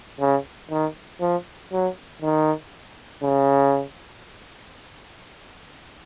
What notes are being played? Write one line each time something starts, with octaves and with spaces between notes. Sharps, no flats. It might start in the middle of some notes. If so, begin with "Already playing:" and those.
C#3
D#3
F3
F#3
D#3
C#3